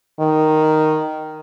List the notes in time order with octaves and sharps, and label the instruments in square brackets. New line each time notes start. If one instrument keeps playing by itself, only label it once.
[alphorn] D#3